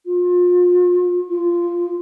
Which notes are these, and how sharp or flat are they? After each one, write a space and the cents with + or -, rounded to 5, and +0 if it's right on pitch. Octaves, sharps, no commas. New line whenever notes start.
F4 +35
F4 -10